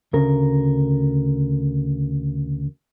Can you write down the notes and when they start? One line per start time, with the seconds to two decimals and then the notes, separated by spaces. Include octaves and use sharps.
0.13 D2 C#3 A#4